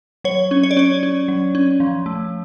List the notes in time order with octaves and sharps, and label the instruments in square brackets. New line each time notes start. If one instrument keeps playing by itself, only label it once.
[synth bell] F#3 C#5
C#4
C#5
D5
C#4 C#5
C#4
F#3
C#4
F3
A3